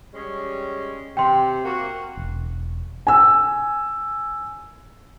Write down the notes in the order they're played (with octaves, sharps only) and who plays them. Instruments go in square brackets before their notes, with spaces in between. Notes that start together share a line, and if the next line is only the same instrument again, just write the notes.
[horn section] G3 G#3 C#4
[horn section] C3 [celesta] G5 C6
[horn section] A#3 F#4
[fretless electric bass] E1
[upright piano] G#5 E6